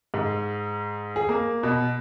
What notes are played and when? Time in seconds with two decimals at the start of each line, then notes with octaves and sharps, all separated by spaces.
0.14 G#2
1.16 G#4
1.29 A#3
1.63 B2